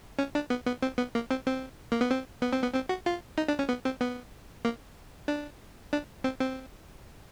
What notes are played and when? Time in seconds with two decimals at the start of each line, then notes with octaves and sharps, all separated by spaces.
0.19 C#4
0.35 D4
0.50 B3
0.67 B3
0.82 C4
0.98 B3
1.15 A#3
1.31 C4
1.47 C4
1.92 A#3
2.01 B3
2.11 C4
2.42 B3
2.53 C4
2.62 B3
2.74 C4
2.89 F#4
3.06 F4
3.38 D#4
3.48 D4
3.59 C#4
3.69 B3
3.85 C4
4.01 B3
4.65 A#3
5.28 D4
5.93 D4
6.24 C4
6.40 C4